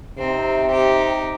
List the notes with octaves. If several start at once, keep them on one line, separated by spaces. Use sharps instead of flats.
C3 C4 D#4
D#4 G4